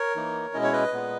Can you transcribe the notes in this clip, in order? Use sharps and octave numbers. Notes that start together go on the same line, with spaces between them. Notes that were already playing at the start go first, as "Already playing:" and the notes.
Already playing: A#4 C#5
E3 A#3 D#4
B2 G#3 C#4 E4 D#5
C#5
B4 D#5
A#2 G#3 B3